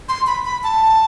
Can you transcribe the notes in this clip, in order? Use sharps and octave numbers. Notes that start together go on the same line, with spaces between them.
C6
B5
B5
A5